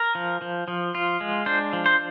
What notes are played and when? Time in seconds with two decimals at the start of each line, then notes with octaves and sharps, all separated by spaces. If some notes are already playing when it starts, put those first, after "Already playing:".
Already playing: A#4
0.15 F3
0.42 F3
0.68 F3
0.95 F4
1.21 G#3
1.46 D4 C5
1.73 F3
1.86 C5